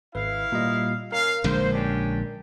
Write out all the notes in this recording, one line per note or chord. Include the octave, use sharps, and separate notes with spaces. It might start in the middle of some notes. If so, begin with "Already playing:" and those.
G#1 E4 B4 F5
A#2 G3 D#5
C#4 A#4 F5
A#1 D3 G#3 C5
C#4 D4 G4